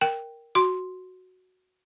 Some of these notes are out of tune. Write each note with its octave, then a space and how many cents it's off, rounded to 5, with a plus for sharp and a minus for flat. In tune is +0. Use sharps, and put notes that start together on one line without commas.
A#4 +0 G5 +0
F#4 +0 C6 +0